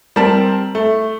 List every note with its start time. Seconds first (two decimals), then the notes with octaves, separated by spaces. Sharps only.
0.16 G3 C4 A#4 A5
0.75 A3